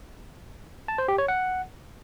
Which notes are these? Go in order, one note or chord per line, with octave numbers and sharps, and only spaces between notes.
A5
C5
G4
C#5
F#5